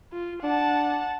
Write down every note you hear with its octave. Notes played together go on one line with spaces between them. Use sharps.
F4
D4 F#5 A5